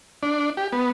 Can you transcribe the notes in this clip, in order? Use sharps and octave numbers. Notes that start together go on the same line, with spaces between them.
D4
G4
B3